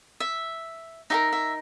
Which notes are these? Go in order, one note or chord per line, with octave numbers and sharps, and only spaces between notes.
E5
D#4 G4 A#4 E5
E5